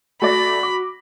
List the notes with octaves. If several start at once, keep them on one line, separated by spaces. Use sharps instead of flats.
A3 F#4 D5 B5 A#6
D6